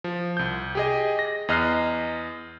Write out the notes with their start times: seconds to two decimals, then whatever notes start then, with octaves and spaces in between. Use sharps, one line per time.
0.04 F3
0.37 C2 G6
0.75 G4 G#4 D#5
1.19 A#6
1.48 E2 D#5 F6 F#6 C7